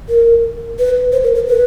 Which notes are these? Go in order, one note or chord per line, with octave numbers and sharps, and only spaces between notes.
A#4
B4
C5
A#4
A#4
B4